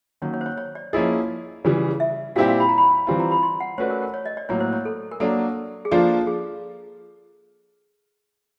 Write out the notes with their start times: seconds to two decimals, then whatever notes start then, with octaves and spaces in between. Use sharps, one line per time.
0.22 D#3 F#3 A#3 C#4 C#5
0.34 C#5
0.41 C5
0.46 C#5
0.58 C#5
0.75 D5
0.93 F3 A#3 C#4 E4 G#4 D#5
1.65 C#3 E3 G3
2.00 E5
2.36 A#2 G3 C4 E4 G4 F5
2.48 F5
2.60 B5
2.69 A#5
2.78 B5
3.07 E3 G3 C4 F4
3.20 A#5
3.31 B5
3.43 C6
3.60 F#5
3.78 A3 C#4 F#4 B4 C5 D5
3.90 A#4
4.02 A#4
4.14 C#5
4.26 D#5
4.37 D5
4.49 A2 F#3 A#3 C#5
4.60 C5
4.73 C#5
4.85 A4
5.11 A#4
5.20 F#3 A#3 D4 A4
5.85 G#4
5.91 F3 A#3 D4 F4 A4
6.27 G#4